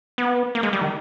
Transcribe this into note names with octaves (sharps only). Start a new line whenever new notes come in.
B3
A#3
G#3
G3
D#3